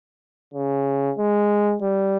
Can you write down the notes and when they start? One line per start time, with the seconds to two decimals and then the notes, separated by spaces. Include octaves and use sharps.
0.54 C#3
1.18 G#3
1.82 G3